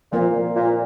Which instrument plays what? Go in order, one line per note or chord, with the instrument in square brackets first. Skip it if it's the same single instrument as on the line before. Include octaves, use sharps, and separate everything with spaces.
[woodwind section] A#2 [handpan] F3 A#3 F4 C5 F5
[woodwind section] A#2